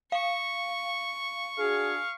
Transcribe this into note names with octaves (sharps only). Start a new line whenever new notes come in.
F5 C#6
D4 F#4 G#4 F5